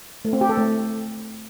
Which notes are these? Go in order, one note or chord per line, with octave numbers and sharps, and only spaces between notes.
A3
C4
G4
A4
A3